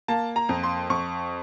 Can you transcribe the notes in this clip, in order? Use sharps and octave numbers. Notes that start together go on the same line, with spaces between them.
A#3 A5
A#5
F2
C6
F2 C#6